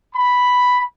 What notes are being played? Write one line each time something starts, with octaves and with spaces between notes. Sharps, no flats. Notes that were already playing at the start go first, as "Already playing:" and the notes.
B5